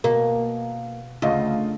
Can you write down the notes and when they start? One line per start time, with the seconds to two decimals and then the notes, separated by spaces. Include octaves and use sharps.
0.04 B2 A#3
1.22 D2 C#3 F4 D#5